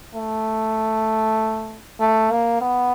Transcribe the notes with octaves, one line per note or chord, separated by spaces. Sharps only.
A3
A3
A#3
B3